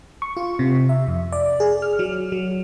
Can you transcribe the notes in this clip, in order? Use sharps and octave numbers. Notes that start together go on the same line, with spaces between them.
C#6
F4
C3
E5
F2
D5
G#4
F6
F#3
F#3